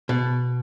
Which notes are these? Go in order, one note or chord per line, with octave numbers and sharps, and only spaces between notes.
B2